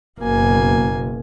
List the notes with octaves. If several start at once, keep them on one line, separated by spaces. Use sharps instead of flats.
F#1 B2 A#3 G#5